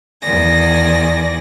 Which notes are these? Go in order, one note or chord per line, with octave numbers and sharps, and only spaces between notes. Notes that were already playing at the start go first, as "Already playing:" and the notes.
E2 D#3 D5 G#5 A#6